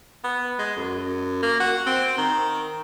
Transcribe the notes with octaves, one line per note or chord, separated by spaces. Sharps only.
B3
G#3
F#2
A#3
F#4
C4
D#3